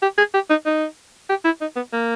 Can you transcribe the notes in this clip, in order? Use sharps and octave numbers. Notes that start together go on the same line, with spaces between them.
G4
G#4
G4
D#4
D#4
G4
E4
D#4
B3
A#3